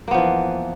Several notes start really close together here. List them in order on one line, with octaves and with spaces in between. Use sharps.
A#3 B3 F3 E3